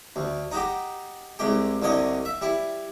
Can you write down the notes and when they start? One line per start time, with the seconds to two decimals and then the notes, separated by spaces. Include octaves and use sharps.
0.16 D2
0.52 D#4 F#4 G4
1.39 C2 G#3 G4
1.82 C2 D3 C#5 D#5
2.25 E5
2.41 G3 E4